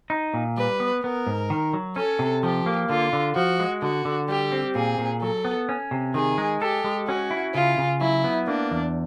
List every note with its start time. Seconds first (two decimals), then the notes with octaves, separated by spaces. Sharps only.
0.10 D#4
0.34 A#2
0.57 G3 B4
0.80 B3
1.04 B3 A#4
1.27 G#2
1.50 D#3
1.73 F#3
1.96 C#4 A4
2.19 C3
2.43 F3 G4
2.66 A#3
2.89 D3 F4
3.13 D3
3.35 F3 F#4
3.60 G#3
3.82 D3 F#4
4.05 D3
4.29 G3 G4
4.52 C4
4.75 A#2 G#4
4.98 A#2
5.21 F#3 A4
5.45 B3
5.69 C#4
5.91 C3
6.14 D#3 G#4
6.38 G#3
6.61 G4 A4
6.84 G#3
7.08 C#4 F#4
7.31 E4
7.54 C#3 F4
7.78 C#3
8.00 F#3 E4
8.24 B3
8.47 A#3 D4
8.71 E2